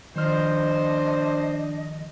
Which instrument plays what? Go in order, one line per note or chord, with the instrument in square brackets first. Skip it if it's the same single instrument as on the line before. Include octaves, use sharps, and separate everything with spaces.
[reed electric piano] D#3 F3 F6 [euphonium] D4 [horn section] C5 [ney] D#5